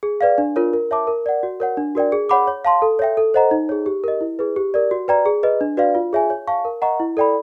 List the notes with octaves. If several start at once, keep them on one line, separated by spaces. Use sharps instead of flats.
G#4
B4 D5 F5
D4
F4 A#4 C#5
A#4
C#5 E5 A5 D6
A#4
D5 F#5
F#4
A#4 C#5 F#5
D4
F#4 A#4 D5 G5
G#4
C#5 F#5 B5 D6
C#5
F5 A5 C6
A4
C#5 E5 G5
A4
C5 D#5 F#5 A#5
D#4
G#4 C#5
G4
A#4 D#5
E4
G#4 B4
G4
A#4 D5
F#4
B4 D5 G5 A#5
G#4
B4 D#5
D4
F#4 B4 D5 F5
F4
G#4 C#5 E5 G#5
C#5
F5 A5 C#6
A#4
D#5 F#5 A#5 C#6
E4
A4 D5 G5 B5